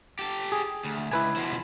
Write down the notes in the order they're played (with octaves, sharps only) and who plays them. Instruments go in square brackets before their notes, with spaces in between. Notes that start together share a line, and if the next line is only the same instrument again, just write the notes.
[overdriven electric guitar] G4 A4
[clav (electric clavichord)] G#4
[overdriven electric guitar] D2
[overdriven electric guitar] C#2 [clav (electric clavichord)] E4 B4 G#5
[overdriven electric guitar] B2 F3